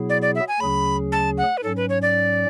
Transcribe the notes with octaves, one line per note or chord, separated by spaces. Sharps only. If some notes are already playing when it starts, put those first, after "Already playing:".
Already playing: B2 F#3 B3 E4 G#4
D5
D5
E5
G#5
D2 C#3 F#3 C#4 G#4 B5
A5
F#5
B4
G#2 F#3 C#4 A4
B4
C#5
D5